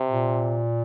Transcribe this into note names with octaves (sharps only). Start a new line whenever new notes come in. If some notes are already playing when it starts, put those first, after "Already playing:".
Already playing: C3
A#2